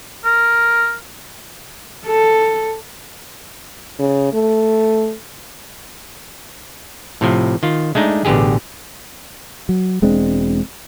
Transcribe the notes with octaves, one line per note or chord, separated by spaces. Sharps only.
A#4
A4
C#3
A3
A2 C3 F3
D#3 F4
G#3 A3 D4 D#4
A1 B2 D3 G4 G#4
F#3
E1 G#3 C4 D4